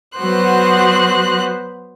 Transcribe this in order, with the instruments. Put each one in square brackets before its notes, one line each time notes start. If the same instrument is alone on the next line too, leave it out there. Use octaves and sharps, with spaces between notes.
[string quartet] F#3 B3 F#4 C5 C6 F#6